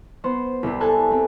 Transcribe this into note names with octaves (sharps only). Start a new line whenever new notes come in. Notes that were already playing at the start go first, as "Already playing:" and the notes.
B3 C5 C6
C2 C3
A4 G#5 A5 F#6
C4